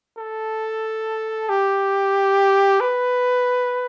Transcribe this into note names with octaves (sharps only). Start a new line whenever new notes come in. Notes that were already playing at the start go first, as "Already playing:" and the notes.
A4
G4
B4